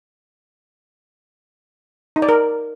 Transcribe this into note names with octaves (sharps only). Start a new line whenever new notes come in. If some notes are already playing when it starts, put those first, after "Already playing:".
D#4
D5
A#4